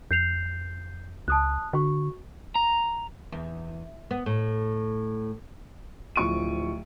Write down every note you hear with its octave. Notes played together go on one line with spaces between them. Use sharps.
F2 G6 C7 F7
C#2 A5 D#6 F#6
D3 F#4 C#6
A#5
E2
B3
A2
D1 F3 C#6 D7 D#7